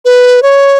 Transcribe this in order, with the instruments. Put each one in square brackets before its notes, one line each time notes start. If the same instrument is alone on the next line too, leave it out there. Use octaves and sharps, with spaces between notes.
[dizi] B4
C#5